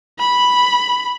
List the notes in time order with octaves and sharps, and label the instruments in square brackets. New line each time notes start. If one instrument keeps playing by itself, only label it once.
[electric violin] B5